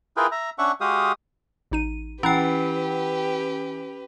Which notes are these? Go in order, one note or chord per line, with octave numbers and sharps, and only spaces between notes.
E4 F4 G#4 A#4 B4 G5
E5 A#5
C#4 D4 E5 F#5 C#6
G#3 F#4 G4 F5 D#6
A1 D#4 D#7
E3 C#4 G4 B4 G5 A#5 B5 F#6